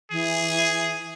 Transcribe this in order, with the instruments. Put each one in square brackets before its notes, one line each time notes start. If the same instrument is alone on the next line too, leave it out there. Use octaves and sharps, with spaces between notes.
[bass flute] E3 [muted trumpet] G#4